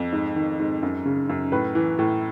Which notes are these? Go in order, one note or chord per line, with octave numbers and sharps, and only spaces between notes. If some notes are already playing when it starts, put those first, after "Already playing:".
Already playing: F2
G#2
D#3
G#2
F#2
C#3
F#2
A2 B4
E3
A2